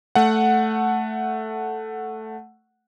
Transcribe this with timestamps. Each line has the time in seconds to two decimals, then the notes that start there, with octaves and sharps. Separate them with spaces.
0.15 A3 F#5